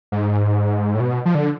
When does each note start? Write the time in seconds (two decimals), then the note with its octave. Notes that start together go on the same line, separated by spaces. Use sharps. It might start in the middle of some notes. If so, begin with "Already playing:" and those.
0.12 G#2
0.95 A2
1.00 B2
1.26 F3
1.35 D3